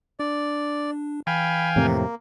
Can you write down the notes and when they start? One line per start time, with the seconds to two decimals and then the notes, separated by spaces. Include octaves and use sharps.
0.20 D4 D5
1.27 E3 F5 G5 G#5 B5
1.76 F2 A2 C3 A#3